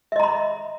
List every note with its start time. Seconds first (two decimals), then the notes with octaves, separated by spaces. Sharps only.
0.12 E5
0.16 D#5
0.20 A#5
0.23 B5